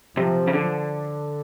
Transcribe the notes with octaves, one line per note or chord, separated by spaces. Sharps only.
C3 F3
C#3
D3